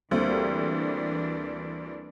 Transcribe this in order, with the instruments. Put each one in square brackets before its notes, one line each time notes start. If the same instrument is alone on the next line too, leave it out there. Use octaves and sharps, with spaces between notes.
[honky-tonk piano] D2 [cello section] E3 D4 [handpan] G3 A#3 C4